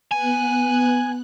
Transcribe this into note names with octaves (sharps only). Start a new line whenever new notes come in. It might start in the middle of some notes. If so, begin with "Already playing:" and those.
B3 G#5 F#6